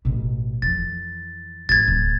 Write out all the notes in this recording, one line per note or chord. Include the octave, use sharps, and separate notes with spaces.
A1 B2
F2 E3 A6
A1 G#6 A6
D1